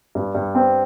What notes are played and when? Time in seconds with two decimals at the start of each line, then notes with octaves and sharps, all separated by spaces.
0.15 G2
0.35 G2
0.55 C4